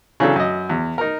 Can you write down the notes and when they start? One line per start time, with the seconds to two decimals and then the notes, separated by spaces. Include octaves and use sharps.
0.20 C#3 E3 F#3 D4 A4
0.36 F#2 D#5
0.70 E2
0.98 D#4 A#4